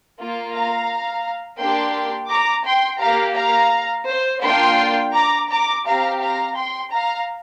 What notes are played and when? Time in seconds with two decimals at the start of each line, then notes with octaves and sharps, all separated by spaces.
0.17 A#3 F4
0.53 F5 A#5
1.59 A#3 D4 G4 G5 C6
2.30 A#5 D6
2.65 G5 C6
3.00 A#3 G4 F5 A#5
3.36 F5 A#5
4.08 C5
4.43 A#3 D4 F4 G5 C6
5.14 A#5 D6
5.49 A#5 D6
5.85 C4 G4 F5 A#5
6.20 F5 A#5
6.56 G5 C6
6.92 F5 A#5